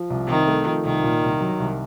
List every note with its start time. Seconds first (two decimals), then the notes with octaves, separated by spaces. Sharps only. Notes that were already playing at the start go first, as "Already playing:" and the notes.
Already playing: F3
0.10 C2
0.28 C3 D#3
0.47 A3
0.66 F3
0.85 C2 D#3
1.03 A#2
1.22 C2
1.41 F#3
1.59 C2